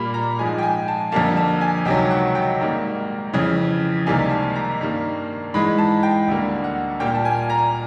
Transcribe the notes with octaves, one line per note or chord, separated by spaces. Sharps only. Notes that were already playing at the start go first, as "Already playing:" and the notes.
Already playing: A#2 G3 A#3 B5
A#5
G#2 F3 G#3 G#5
G5
G#5
A5
F2 D3 G3 A#3 A5
A5
G#5
C#2 C3 D#3 F#3 G5
F#5
G5
G#2 D#3 G3 A#3
F2 C#3 E3
C#2 C3 D#3 G3 A#3 G#5
A5
A#5
G2 D#3 G3 A#3
G#2 E3 G#3 B5
A5
G5
D2 D3 G3 A#3
F#5
A#2 G3 A#3 G5
A5
G#5
A#5